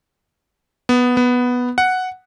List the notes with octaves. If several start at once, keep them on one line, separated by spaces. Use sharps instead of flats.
B3
B3
F#5